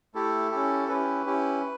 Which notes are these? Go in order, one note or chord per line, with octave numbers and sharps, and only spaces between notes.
A3 E4 G4 A4
C#4 E4 G4
C#4 E4 G4 B4
C#4 E4 G4